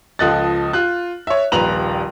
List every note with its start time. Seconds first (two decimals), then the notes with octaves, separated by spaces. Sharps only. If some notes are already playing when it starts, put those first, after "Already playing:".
0.19 C#2 F3 A4 D#5 F#6 A6
0.73 F4 F#6
1.27 C#5 E5
1.52 D#1 A#1 B4 A#5 F7 F#7